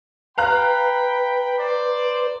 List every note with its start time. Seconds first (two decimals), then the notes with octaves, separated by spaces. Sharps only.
0.38 B4 F5 G5 A#5 B5 F#6
1.58 C5 D5